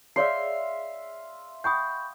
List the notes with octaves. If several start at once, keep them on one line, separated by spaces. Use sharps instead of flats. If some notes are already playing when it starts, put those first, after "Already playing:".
G#4 C#5 D5 E5 F5 C6 C7
F#5 G5 B5 C#6 D#6 G6